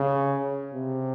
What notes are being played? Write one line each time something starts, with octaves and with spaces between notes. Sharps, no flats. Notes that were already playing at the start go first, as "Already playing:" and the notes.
Already playing: C#3
C3